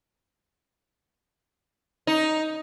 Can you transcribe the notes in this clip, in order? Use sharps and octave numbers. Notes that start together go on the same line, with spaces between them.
D#4